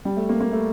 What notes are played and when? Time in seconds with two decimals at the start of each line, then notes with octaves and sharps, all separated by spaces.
0.05 G3
0.17 A3
0.29 A#3
0.40 A#3
0.52 A3